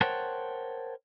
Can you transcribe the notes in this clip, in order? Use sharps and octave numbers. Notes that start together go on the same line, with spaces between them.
A#4 C5 C#5 F#5 G5 A5